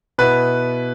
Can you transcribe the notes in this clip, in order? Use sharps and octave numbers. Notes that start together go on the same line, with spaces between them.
B2 B3 E4 B4